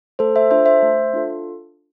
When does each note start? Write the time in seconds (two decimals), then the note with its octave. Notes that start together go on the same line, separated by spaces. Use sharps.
0.19 A3 A4 C5
0.36 C5 E5
0.51 D4 F4 A4 C5 E5
0.66 C5 E5
0.82 A3
1.13 D4 F4 A4